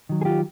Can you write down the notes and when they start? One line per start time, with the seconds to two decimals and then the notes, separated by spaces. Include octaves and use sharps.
0.09 D#3 F#3
0.21 G#4
0.25 F4 G4